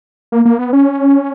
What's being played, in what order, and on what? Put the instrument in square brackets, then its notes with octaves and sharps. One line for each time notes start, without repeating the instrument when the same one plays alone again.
[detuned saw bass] A#3
A#3
B3
C#4